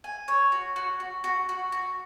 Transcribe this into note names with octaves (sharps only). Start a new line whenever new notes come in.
G#5
C#5
F#4
F#4
F#4
F#4
F#4
F#4